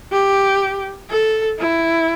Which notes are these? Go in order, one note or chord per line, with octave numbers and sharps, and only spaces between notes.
G4
A4
E4